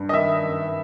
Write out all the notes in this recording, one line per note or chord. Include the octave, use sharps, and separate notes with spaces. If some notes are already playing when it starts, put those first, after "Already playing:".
Already playing: G2
D#5
D#3 E5
F#2